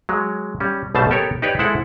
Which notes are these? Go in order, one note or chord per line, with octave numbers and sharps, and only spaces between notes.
F#3 G#3
G3 C#4
B1 B2 G3 A3 C5 A5
B3 G4 A4 A#4 C#5
D#4 G4 B4 C#5 D5
G#3 E4 A4 C5 F#5